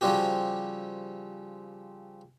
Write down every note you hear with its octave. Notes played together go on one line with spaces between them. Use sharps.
C#3 F3 G3 C4 F#4 G4